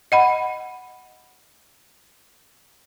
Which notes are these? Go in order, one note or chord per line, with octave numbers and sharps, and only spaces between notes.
D#5 F#5 B5